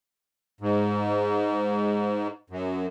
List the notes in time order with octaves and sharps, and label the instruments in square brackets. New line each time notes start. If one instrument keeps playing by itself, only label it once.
[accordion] G#2
F#2